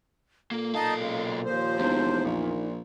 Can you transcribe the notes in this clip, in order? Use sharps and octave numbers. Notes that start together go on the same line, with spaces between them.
A#2 A#3 A4
B1 D#4 D#5 F5 A5
C#3 G#3
D#2 F3 C5
E1 E2 D#4
A#1 A#2